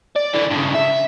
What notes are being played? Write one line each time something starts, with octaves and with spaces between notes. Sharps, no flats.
D5
D3 E3
G2 C#3
E5